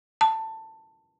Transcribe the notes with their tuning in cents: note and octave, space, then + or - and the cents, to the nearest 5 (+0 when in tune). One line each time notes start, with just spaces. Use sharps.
A5 +15